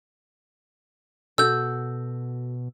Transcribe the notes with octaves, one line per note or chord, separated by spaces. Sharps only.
B2 F#4 A4 E6 G6